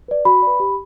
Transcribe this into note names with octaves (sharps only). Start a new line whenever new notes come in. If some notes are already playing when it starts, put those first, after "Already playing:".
B4 D5
F#4 B5
B4 D5
G4